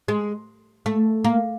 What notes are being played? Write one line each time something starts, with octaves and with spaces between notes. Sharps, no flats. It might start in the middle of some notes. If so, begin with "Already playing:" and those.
G#3
A3
A#3